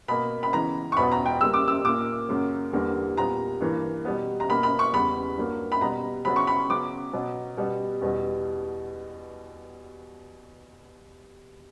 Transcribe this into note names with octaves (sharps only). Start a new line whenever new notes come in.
B2 A#3 B5
B5
C#3 E3 B3 A#5
C#6
E2 B2 F#3 B3 B5
A#5
G5
C#3 G3 A#3 E6
D6
E6
A#2 A#3 D6
F#2 C#3 F#3 A#3
E2 D3 G3 A#3
A#2 G3 B3 A#5
G2 E3 A#3
B2 G3 B3
A#5
B2 A#3 B5
B5
C#6
E2 C#3 G3 B3 B5
G2 F#3 A#3
B5
B2 G3 B3 A#5
C#3 F#3 B3 B5
C#6
B5
C#3 F#3 B3 D6
B2 F#3 B3
B2 G3 B3
E2 B2 G3